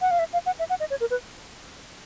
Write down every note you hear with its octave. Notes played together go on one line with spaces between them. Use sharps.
F#5
F5
E5
F5
F#5
E5
F#5
D#5
C#5
A#4
B4